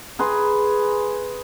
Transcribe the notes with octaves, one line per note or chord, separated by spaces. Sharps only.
G#4 B4 A#5 C6